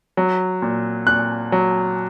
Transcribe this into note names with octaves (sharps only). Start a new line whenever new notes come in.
F#3
A#2
A#2 F#6
F#3